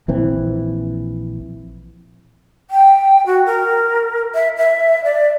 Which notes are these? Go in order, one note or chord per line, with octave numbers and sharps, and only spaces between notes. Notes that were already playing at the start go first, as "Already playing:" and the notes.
A#1 E3 C4
G5
F#4
A#4
E5
E5
D5